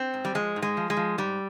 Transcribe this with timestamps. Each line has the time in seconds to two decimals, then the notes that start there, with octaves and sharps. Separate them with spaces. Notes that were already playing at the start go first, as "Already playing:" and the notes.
Already playing: C4
0.14 G#2
0.25 G3
0.35 F3 G#3
0.56 G#2
0.62 G#3
0.77 F3
0.90 G#3
0.97 F3
1.18 G#2 G3